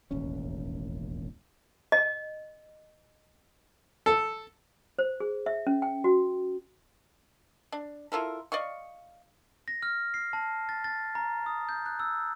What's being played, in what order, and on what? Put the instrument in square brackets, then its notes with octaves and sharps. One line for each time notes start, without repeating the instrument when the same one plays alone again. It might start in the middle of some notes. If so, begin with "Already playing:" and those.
[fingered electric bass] E1 A1 D#2 C#4
[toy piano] D#5
[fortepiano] A4
[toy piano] C5
G#4
E5
C#4
G5
F#4
[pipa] D4
E4 F4 A4 A#4
D5 D#5 F5 C#6
[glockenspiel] A#6
F6
C7
A5
A6
A6
A#5
D#6
G6
F#6
E6